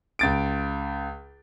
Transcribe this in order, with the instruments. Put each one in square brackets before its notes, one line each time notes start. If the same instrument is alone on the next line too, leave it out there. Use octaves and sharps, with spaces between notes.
[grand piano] C#2 A6 D7